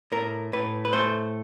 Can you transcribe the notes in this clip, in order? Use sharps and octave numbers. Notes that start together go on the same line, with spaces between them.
A2 A#4
A2 B4
B4
A3 C5